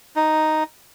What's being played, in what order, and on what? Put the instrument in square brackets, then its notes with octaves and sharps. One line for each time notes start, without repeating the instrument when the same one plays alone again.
[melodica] D#4